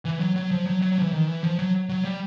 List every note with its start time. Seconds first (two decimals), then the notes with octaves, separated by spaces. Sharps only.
0.05 E3
0.20 F#3
0.36 F#3
0.51 F3
0.66 F#3
0.82 F#3
0.92 F#3
0.98 F3
1.02 E3
1.13 D#3
1.28 E3
1.43 F3
1.59 F#3
1.89 F#3
2.05 G3